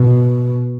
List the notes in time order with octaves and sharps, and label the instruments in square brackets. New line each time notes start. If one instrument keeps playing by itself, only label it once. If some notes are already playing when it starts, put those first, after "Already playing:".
Already playing: [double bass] B2